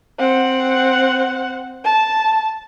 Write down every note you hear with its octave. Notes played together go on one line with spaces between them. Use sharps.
C4 F#5
A5